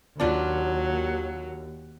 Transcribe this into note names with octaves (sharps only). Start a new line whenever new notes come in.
D#2 F#3 D4 F4 B4